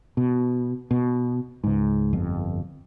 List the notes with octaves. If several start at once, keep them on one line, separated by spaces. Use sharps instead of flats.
B2
B2
C#2 G#2
G1 F2